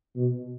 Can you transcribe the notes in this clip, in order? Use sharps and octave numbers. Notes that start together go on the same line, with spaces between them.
B2